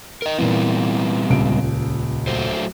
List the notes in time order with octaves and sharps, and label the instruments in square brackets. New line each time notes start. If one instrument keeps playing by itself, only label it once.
[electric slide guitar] A#4 D#5
[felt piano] A#2 E3 [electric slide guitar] G3 B3 C4
[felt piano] D#1 C#2 D7
[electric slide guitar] F#3 A3 C5